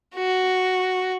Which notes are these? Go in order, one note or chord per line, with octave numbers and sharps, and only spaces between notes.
F#4